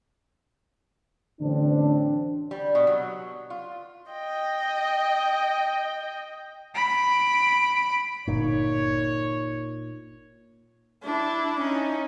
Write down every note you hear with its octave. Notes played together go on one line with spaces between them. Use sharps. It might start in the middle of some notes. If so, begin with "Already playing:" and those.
A1 D3 C4 D4
G3
B2
F#3
F4
D#5 G5
B5 D7
G1 A#2 D#4 C#5
D4 E4
C#4 D#4